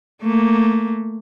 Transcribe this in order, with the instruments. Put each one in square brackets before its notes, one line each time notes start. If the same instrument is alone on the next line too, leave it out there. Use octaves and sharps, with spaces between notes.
[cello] A3 A#3